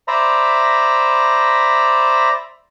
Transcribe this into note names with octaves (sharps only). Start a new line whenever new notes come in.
C5 D5 E5 A#5 B5